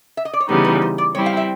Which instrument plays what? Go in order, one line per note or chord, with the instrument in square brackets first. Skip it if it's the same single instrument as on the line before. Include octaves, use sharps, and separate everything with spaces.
[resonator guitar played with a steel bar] E5
D#5
D5
C#5
[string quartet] C#3 E3 G3 B3 D#4 [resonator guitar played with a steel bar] C5
[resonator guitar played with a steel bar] B4
C5
D5
[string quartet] G3 C4 E4 [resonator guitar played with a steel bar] C#5
[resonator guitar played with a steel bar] F5
E5